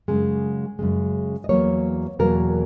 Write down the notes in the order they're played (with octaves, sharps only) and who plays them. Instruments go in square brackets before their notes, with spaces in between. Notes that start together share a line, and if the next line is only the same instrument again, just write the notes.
[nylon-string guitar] F#2 C#3 G#3
F#2 C#3 G#3
D#5
E2 B2 F#3 A#3 C#5
E2 B2 F#3 A#3 A#4